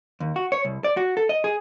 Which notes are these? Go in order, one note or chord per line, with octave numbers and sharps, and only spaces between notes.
D#2
F#4
C#5
C2
D5
F#4
A4
D#5
G#4